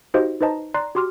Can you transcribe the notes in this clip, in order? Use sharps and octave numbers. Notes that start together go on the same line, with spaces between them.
D#4 F#4 G4 C5 D#5 F5
D#4 B4 C5 D#5 A5 A#5
D5 A#5 C6 F#6 C7
F#4 G4 C6 D6 F6